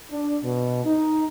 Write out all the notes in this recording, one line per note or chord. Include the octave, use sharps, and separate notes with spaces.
D4
B2
D#4